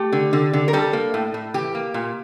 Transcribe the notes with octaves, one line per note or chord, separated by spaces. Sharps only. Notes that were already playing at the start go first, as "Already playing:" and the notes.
Already playing: A3 G4
D3
D3
D3
A#4
G3 A4
A#3
A2
A2
E3 G4
A#3
A#2